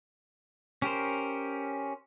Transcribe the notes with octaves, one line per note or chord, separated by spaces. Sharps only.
C#4 G4 A#4 C5